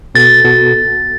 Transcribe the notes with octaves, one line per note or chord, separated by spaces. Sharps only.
B2 B3 F#4 A4 A6
B2 B3 F#4 A4